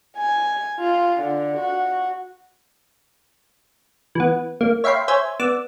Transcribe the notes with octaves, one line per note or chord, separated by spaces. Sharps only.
G#5
F4
D3
F#4
E3 B3
A#3
C#5 E5 F5 G5 B5 C6
C5 C#5 E5 G#5
B3 D5 D6 E6